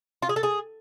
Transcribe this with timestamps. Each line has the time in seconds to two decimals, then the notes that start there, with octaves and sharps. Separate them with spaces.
0.22 F4
0.29 G#4
0.36 A4
0.43 G#4